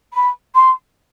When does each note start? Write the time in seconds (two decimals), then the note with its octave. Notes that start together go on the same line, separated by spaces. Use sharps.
0.13 B5
0.55 C6